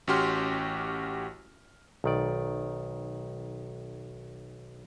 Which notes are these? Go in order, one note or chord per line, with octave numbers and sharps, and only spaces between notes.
A1 C#4 F#4 G4 C6 F6
B1 D#3 D5